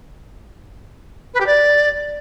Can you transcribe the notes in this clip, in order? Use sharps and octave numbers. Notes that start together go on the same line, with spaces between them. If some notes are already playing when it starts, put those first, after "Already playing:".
B4
G4
D5